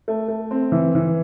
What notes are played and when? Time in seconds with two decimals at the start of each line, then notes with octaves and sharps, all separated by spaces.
0.08 A3
0.28 A3
0.51 C4
0.72 E3
0.95 E3